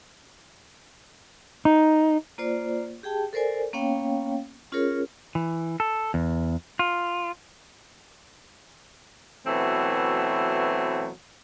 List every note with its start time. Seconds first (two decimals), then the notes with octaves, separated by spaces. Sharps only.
1.65 D#4
2.38 A#3 F4 C5 D5
3.03 G4 G#4 G5 A5
3.33 A4 A#4 C5 D5 G#5
3.73 A#3 B3 C#4 C#5 F5 G5
4.72 C#4 F4 G#4 A#4 C#5
5.35 E3
5.80 A4
6.14 E2
6.79 F4
9.46 B2 E3 F#3 A3 C4